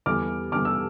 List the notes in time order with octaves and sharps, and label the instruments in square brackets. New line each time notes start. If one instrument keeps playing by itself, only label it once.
[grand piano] E2 D3 G3 D6 F6
E2 D3 G3 D6 F6
E6